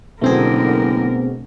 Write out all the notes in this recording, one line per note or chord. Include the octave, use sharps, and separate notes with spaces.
F#1 B2 D3 A3 C4 G#4 A#4